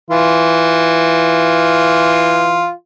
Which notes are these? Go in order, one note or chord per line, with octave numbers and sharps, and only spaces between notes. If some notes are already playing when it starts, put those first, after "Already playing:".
E3 F4